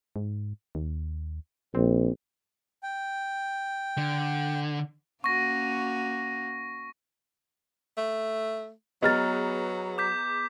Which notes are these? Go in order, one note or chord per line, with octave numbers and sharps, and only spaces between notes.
G#2
D#2
A#1 C4
G5
D3
A#3 C#4 F#4 C#6 A#6
A3
F#3 B3 G#4 D#5 A#5 F6 A6
D6 G6 B6